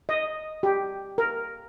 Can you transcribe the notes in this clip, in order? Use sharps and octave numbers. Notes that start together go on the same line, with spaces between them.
D#5
G4
A#4